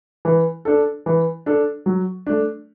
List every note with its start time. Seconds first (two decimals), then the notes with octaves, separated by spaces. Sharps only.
0.25 E3
0.65 D4 A4
1.06 E3
1.46 D4 A4
1.86 F#3
2.27 A3 D4